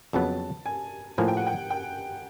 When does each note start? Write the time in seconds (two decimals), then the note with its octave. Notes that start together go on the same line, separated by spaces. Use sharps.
0.13 F2 C#3 F#3 B3 A5
0.66 G#5
1.18 A2 F3 A#3 G#5
1.28 G5
1.37 F#5
1.47 G5
1.70 G5